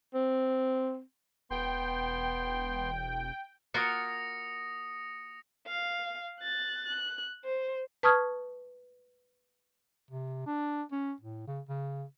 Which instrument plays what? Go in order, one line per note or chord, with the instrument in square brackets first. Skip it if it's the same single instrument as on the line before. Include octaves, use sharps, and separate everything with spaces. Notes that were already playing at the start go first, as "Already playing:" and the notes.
[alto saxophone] C4
[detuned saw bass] E1 [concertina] B3 C6 [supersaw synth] G5
[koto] A#3 F4 F#4 [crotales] D#6 A#6 C#7
[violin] F5
F#6 A6
F#6
C5
[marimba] B4 A5 C#6 D#6 F6 G#6
[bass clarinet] C3
D4
C#4
A2
C#3
C#3